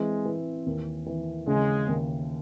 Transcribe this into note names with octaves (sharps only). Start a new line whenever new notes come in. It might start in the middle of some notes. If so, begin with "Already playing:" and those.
Already playing: E3 G#3 C4
E3
D#2
E3
C#3 G#3
D#2